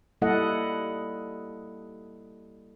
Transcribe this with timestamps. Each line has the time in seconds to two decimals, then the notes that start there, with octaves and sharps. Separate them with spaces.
0.22 G3 A#3 E4 A4 D#5 F#5